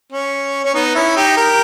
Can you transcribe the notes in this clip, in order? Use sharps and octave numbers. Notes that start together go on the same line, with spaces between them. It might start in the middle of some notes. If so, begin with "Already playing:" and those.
C#4
C#4
B3 D#4
C#4 E4
D#4 G4
G4 A#4